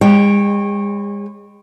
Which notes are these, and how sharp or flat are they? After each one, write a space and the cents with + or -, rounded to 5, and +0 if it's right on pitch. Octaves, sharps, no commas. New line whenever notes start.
G#3 -40 C#5 -20 G5 +0